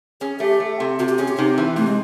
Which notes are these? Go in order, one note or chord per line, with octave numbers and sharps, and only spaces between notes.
C#4 G#4
A3 G4
A3
C3
C3 F#4
G4
C#4 G#4
G4
C3 D#4
E3
C3 A3
G#3